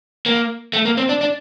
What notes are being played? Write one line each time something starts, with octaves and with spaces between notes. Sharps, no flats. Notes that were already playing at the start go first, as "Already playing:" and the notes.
A#3
A3
A#3
C4
D4
D4